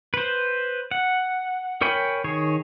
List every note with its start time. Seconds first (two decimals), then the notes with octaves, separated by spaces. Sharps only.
0.14 B4 C5
0.91 F#5
1.81 A#4 C#5 G5 G#5 B5
2.24 D#3 G#4 C#5